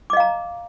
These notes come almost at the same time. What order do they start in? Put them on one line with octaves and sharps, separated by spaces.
D6 D#5 F5 A#5